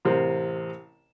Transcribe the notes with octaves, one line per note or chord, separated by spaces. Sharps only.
A1 C3 A#4 C5